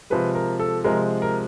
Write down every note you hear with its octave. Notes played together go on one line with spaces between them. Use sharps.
C3 F3 G#3 B4
A#4
A4
C3 F3 G#3 A#4
A#4